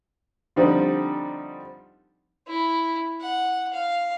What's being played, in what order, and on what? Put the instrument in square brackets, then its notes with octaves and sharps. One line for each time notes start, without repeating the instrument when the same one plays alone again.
[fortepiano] D3 F3 G3 C4 D#4
[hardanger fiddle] E4
F#5
F5